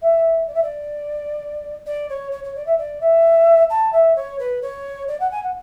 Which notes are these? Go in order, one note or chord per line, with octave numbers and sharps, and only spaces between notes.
E5
D5
E5
D5
D5
C#5
C#5
C#5
D5
E5
D5
E5
A5
E5
C#5
B4
C#5
D5
F#5
G#5
F#5